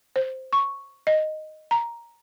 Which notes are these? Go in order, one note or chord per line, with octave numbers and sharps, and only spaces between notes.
C5
C#6
D#5
A#5